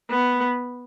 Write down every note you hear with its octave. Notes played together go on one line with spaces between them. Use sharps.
B3